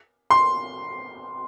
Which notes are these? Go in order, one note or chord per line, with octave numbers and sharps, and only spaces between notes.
C6